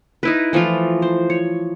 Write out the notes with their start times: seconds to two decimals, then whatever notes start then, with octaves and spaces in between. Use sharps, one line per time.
0.23 D#4 E4 B4
0.53 E3 F3 A3 F4
1.02 C5
1.30 C#5